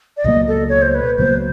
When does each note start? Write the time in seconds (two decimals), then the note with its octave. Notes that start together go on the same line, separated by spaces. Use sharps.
0.17 D5
0.24 C#2 B2 F#3 A#3 D#5
0.48 A4
0.69 C#5
0.82 C5
0.95 B4
1.18 C#2 B2 F#3 A#3 C5